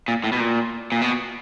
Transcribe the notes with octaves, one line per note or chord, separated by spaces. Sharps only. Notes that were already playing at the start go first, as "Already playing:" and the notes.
A#2
A2
B2
A#2
A#2
B2